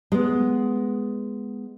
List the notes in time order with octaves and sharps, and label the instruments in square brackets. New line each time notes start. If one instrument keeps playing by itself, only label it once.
[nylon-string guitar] G#3 B3